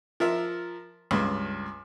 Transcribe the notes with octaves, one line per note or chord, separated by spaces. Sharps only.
F3 A#4 E5
C#2 G2